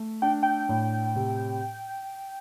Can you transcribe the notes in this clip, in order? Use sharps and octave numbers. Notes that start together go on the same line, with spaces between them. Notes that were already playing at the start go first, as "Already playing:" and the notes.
Already playing: A3
D4 G5
G5
A2
C3